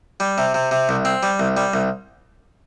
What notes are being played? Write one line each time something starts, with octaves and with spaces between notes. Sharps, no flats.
G3
C3
C3
C3
C2
C4
G3
C2
G3
C2